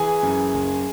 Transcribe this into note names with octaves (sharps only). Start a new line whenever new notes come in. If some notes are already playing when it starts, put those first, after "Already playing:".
Already playing: E3 G#4 G#5
F#2
F#1